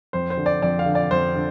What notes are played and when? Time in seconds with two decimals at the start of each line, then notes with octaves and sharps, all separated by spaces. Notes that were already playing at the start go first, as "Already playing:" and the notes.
0.13 F2 C5
0.30 C5
0.37 D3
0.46 D5
0.62 F2 D5
0.79 F5
0.86 D3
0.95 D5
1.11 F2 C5
1.35 D3